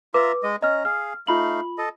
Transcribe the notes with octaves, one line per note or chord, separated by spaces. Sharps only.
F4 B4 E5 A#5 D6
G#3 D#5
C#4 D#5 A#5 F6
G#4 F5 F6
A3 D#4 F4 F5 B5 F#7
A4 D#5